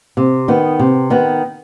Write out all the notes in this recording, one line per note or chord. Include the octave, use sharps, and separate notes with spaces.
C3
D#3 B3
C3
D#3 B3